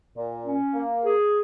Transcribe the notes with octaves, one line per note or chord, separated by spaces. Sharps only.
A#2
C#4
A#3
G#4